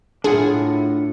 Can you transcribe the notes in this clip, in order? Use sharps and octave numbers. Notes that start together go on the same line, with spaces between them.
A2 D4 F4 G#4 F#5